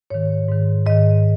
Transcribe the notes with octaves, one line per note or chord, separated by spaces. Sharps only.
G#2 D#3 C#5
G#2 D#3
G#2 D#3 D#5